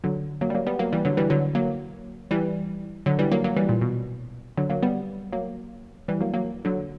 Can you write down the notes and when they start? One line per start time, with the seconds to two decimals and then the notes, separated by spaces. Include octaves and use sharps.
0.04 D3 F#3
0.41 F#3 A#3
0.50 G3
0.55 F#3 A#3
0.67 G3 B3
0.79 F#3 A#3
0.92 E3 G3
1.05 D3 F#3
1.17 E3 G3
1.30 D3 F#3
1.55 F#3 A#3
2.31 E3 G3
3.06 D3 F#3
3.19 E3 G3
3.32 F#3 A#3
3.44 F#3 A#3
3.57 E3 G3
3.69 A#2
3.81 B2
4.57 D3 F#3
4.70 F#3 A#3
4.83 G3 B3
5.33 F#3 A#3
6.08 E3 G3
6.21 F#3 A#3
6.34 F#3 A#3
6.65 D3 F#3